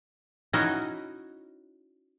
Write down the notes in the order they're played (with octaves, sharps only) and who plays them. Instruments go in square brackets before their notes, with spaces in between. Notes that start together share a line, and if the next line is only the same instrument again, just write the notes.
[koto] C#4 D#4 E4 F#4 C#5 D#5